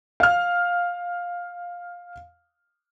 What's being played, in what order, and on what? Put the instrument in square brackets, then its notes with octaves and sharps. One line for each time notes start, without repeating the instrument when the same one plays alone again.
[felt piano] F5 F6